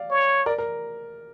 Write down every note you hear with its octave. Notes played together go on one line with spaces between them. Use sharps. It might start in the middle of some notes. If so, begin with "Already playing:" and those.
Already playing: D5 F5
C#5
A#4 D5
A#4